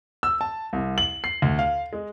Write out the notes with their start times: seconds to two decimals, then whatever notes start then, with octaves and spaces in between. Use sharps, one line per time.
0.23 E6
0.41 A5
0.73 C2
0.98 F#7
1.24 C7
1.42 D2
1.59 F5
1.93 G#3